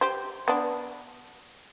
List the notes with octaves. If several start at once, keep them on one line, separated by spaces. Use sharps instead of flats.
G4 C5
B3 D4